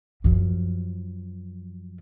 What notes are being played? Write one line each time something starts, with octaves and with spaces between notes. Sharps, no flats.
F#2 F3